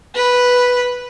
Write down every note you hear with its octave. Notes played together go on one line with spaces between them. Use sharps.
B4